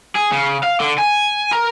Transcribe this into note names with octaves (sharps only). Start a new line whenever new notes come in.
G#4
C#3
F5
D3
G#5
A#4